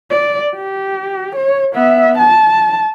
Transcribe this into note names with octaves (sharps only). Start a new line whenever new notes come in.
D5
G4
C#5
B3 E5
A5